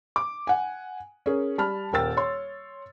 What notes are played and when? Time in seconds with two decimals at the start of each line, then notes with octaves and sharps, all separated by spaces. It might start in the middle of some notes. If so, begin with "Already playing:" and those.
0.16 D6
0.47 F#5 G#5
1.26 C#4 G#4 A#4
1.58 G3 A5 B5 F6
1.93 D#1 A#4 G5 E6 A6
2.17 C#5 C6